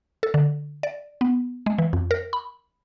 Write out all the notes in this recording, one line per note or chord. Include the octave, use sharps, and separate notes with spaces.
A4
D3
D5
B3
G#3
E3
F2
A#4
B5